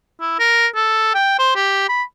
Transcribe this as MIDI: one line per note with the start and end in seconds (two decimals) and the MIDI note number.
0.20 0.36 64
0.39 0.67 70
0.75 1.12 69
1.14 1.36 79
1.39 1.54 72
1.55 1.87 67
1.89 2.03 83